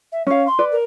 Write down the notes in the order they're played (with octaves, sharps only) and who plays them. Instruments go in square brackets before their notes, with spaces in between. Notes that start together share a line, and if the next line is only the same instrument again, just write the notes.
[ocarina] E5
[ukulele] C#4 F5 [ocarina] C#5
[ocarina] C6
[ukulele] B4 D5
[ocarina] A#4